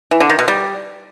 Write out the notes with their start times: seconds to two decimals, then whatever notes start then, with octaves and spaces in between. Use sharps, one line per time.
0.11 E3
0.20 D3
0.30 D#3
0.39 B2
0.48 G3